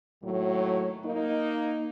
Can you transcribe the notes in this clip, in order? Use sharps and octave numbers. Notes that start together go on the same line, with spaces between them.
D#2 A2 F#3
A#3 D#4